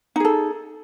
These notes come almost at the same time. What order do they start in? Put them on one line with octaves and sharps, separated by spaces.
D#4 G#4 A4